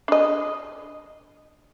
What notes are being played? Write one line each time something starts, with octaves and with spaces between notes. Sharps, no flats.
D4 D#5